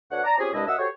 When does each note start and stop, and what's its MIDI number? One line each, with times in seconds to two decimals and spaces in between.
0.11 0.22 38
0.11 0.22 62
0.11 0.22 71
0.11 0.22 73
0.11 0.22 78
0.24 0.38 74
0.24 0.38 81
0.24 0.38 82
0.39 0.50 60
0.39 0.50 61
0.39 0.50 65
0.39 0.50 67
0.39 0.50 68
0.53 0.64 36
0.53 0.64 43
0.53 0.64 56
0.53 0.64 62
0.53 0.64 64
0.53 0.64 75
0.67 0.75 42
0.67 0.75 75
0.67 0.75 76
0.67 0.75 78
0.67 0.75 88
0.78 0.88 66
0.78 0.88 67
0.78 0.88 69
0.78 0.88 72
0.78 0.88 73